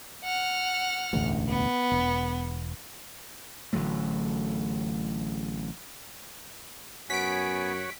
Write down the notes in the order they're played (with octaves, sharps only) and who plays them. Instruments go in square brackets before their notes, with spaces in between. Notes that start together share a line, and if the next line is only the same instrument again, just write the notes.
[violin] F#5 F6
[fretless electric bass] E1 A1 D2
[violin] B3
[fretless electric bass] E1
[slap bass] A1 D3 F#3 A3
[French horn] F#2 [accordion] B3 G#5 [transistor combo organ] F#4 C#5 [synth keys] B6 D7